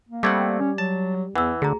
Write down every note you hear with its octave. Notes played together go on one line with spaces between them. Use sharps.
A#3
G3 A3 C4 F#5 D6 G#6
C#4
F#3 A5
E2 E3 F#5 E6
D2 D3 G#4 A#5